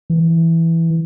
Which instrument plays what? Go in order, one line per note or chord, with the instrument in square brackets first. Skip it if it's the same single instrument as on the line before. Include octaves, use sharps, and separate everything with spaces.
[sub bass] E3